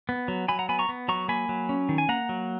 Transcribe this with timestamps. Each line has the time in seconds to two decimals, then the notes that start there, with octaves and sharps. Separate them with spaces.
0.09 B3
0.28 F#3
0.48 F#3 G#5 B5
0.59 F#5 A#5
0.69 B3 G#5 B5
0.79 A#5 C#6
0.89 B3
1.08 F#3 A#5 C#6
1.28 A#3 G#5 B5
1.49 F#3
1.69 C#4
1.89 D#3
1.98 G#5
2.09 A#3 F#5 A#5
2.29 F#3